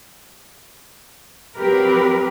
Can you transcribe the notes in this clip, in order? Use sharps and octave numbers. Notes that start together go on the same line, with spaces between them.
F3 F#3 C4 G4 A#4 B4